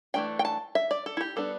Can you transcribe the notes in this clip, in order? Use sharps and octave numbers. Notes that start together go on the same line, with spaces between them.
E3 A3 D4 G5
G5
A5
E5
D5
A4
E4
G4
G3 B3 D4 A4